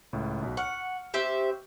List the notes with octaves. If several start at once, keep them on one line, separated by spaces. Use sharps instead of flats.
C#2 A2
B1 F#4
F#5 C#6 F6 C#7
C4 G4 E5